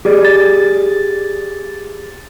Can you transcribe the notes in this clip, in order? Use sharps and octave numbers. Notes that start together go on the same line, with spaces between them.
G4 G#4 D5
A6